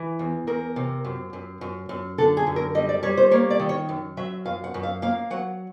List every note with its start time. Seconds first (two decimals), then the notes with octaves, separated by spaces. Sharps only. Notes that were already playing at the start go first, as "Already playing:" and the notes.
Already playing: E3
0.19 E2
0.47 E2 A#4
0.76 C3
1.05 F#2
1.33 F#2
1.61 F#2
1.89 F#2
2.18 D3 A4
2.37 G#4
2.47 F#2
2.56 A#4
2.75 G3 D#5
2.89 D5
3.03 G3 C#5
3.17 C5
3.31 A#3 C#5
3.50 D5
3.60 D#3
3.69 C#5
3.89 F#2
4.17 F#3 E5
4.45 F#2 F5
4.64 F#5
4.74 F#2
4.83 F5
5.02 A#3 F5
5.30 F#3 F#5